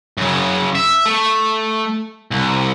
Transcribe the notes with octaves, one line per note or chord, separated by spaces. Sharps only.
F#2 C#3
E5
A3
C2